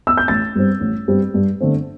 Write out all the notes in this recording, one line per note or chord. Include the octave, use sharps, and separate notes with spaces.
E6
G6
A1 A6
G2 G3 C4
A1
G2 G3 C4
G2
D3 A3 C4